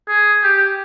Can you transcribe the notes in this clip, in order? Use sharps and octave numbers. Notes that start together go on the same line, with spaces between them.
G#4
G4